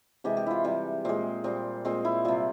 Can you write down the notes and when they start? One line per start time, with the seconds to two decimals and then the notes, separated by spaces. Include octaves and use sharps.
0.24 C3 E3 G#3 G4
0.37 G4
0.47 E4 F4
0.64 C3 E3 G3
1.05 A#2 G#3 C4
1.44 A#2 G3 C4
1.85 A#2 G#3 C4
2.05 E4
2.25 C3 G3 F4